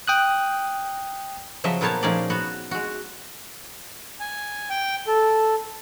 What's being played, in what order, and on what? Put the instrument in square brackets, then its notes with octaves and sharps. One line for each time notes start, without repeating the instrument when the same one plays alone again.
[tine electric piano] G5 D#6 F#6
[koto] C#3 F3 F#3 D#5 E5
A#2 B3 A#4 C5 C#5 A5
A#2 F3 C#4 D#4 G#4 D5
B3 F#4
G#3 F#4
[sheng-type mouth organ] G#5
G5
A4